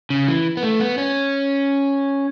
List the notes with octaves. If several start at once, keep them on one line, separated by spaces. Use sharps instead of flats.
C#3
E3
B3
A3
B3
C#4